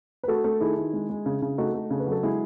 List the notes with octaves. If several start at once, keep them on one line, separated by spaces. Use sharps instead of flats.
B4
A3 F#4 A4
A3
D#3 E4 G#4
D#3
G#3
G#3
C#3
C#3
A3 D#4 F#4
A3
C#3
B4
F#3
A4
G#3 E4 G#4